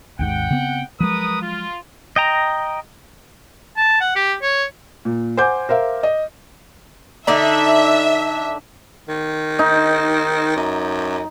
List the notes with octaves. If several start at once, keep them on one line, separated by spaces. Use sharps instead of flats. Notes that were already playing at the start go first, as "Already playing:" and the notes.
G#1 D#2 G#2 F#5 G5
C#3 B3 C4
F3 F#3 G#3 A#4 B4 D#6
F4
D#5 G5 A#5
A5
F#5
G4
C#5
A#2
C5 F#5 G#5 D6 G6
A#4 C5 E5 F5
D#5
D3 D4 D#4 E5
D#3
D#4
F#2